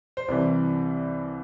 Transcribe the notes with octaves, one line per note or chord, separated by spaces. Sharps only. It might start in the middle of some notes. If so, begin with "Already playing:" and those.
C5
C2 C3 E3 D5